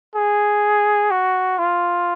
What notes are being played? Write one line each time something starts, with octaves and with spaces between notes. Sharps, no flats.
G#4
F#4
F4